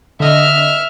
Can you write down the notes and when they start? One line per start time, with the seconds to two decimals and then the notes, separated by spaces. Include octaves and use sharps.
0.20 D3 D#5 E5 F6